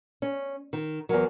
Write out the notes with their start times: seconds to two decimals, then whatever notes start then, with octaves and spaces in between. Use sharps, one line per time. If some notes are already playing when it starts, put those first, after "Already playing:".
0.22 C#4
0.73 D#3
1.09 E2 F#3 A#4